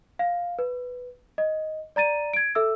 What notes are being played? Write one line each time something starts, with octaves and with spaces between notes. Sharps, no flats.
F5
B4
D#5
D5 A#5 A6 D#7
G#6 D7
A4 E5 E6